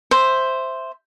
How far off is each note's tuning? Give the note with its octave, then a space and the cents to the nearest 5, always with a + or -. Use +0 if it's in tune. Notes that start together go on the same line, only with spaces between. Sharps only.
C5 +0 E5 +0